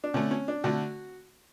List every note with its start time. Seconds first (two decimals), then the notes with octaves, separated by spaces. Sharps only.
0.04 D4
0.14 D3 A3 C#4
0.31 C#4
0.48 D4
0.64 D3 A3 F#4